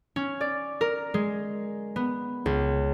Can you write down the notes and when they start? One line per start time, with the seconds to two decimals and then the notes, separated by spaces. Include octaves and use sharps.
0.16 C#4
0.41 D5
0.81 A#4
1.14 G#3
1.96 B3
2.46 C#2